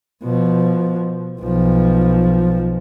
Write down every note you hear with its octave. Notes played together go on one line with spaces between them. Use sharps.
B2 F3
B1 F3